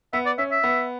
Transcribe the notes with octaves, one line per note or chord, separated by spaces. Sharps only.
B3 E5
D5
C#4 E5
E5
B3